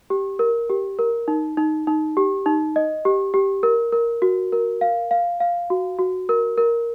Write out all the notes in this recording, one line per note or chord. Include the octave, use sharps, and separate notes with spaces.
G4
A#4
G4
A#4
D#4
D#4
D#4
G4
D#4
D#5
G4
G4
A#4
A#4
F#4
A#4
F5
F5
F5
F#4
F#4
A#4
A#4